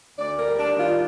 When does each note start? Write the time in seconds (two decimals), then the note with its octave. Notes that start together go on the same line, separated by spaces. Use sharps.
0.18 D2 D5
0.38 A#4
0.46 G3
0.59 D4
0.73 D#3
0.80 F4